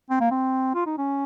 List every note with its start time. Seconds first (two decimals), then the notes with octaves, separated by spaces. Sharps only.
0.10 C4
0.20 A#3
0.31 C4
0.75 F4
0.86 D#4
0.98 C#4